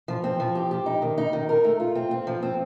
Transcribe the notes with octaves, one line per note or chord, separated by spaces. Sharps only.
F3
C4
F3
G4
G4
D#4
D#3
D#4
D#3
A#4
A3
F4
C4
C4
F3
C4